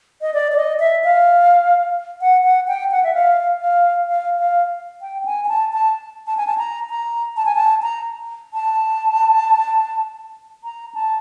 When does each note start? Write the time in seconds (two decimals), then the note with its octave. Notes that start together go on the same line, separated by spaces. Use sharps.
0.22 D#5
0.34 D5
0.52 D5
0.57 D#5
0.80 E5
1.04 F5
2.21 F#5
2.44 F#5
2.68 G5
2.91 F#5
3.04 E5
3.14 F5
3.61 F5
4.08 F5
4.39 F5
5.02 G5
5.26 G#5
5.45 G#5
5.49 A5
5.73 A5
6.27 A5
6.37 G#5
6.47 A5
6.58 A#5
6.90 A#5
7.37 A5
7.46 G#5
7.55 A5
7.82 A#5
8.53 A5
10.64 A#5
10.95 A5